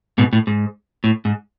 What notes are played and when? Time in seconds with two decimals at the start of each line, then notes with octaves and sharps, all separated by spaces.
0.18 G#2 B2
0.33 A2
0.47 G#2
1.04 A2
1.25 G#2